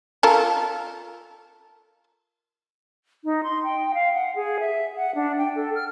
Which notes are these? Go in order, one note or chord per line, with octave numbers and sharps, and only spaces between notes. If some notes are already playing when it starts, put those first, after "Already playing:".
F4 A4 A#4
D#4
C6
G5
F5
F#5
G#4
E5
F#5
D4
G5
A4
F6